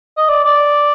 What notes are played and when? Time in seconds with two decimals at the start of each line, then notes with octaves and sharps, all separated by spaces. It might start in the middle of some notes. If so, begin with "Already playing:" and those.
0.17 D#5
0.28 D5
0.44 D5